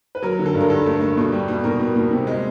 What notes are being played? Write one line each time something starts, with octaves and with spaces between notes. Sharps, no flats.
B4
F#3 A#4
D3
A4
G2
A#4
G2 A4
A3
A3
B2
G3
B2
B2 A#4
B2
B2
C3
G#3